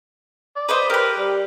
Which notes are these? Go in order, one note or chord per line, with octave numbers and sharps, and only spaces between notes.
D5
B4 C5 D#5
G4 A#4 B4
G3